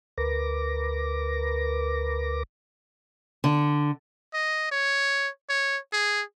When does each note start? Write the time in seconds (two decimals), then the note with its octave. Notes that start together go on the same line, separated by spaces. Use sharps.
0.18 D2 A#4 B4 D6 A#6
3.44 D3
4.34 D#5
4.71 C#5
5.49 C#5
5.93 G#4